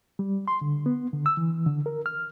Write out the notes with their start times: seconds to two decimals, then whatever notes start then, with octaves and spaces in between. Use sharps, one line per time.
0.19 G3
0.48 C6
0.61 D3
0.86 B3
1.13 D3
1.26 E6
1.37 E3
1.66 D3
1.86 A#4
2.06 F6